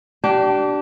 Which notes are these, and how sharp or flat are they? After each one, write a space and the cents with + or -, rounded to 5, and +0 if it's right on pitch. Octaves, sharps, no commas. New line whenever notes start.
D4 +0 G4 -30